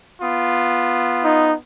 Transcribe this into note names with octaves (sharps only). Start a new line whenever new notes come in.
B3 F4
D#4